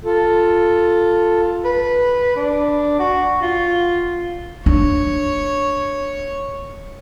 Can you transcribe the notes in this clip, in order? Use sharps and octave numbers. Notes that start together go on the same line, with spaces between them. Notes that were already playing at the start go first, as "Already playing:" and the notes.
F4 A4
B4
D4
F#4
F4
D4 C#5